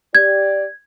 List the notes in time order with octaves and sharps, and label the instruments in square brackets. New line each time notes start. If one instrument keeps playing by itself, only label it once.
[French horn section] G4 D5 [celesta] G#6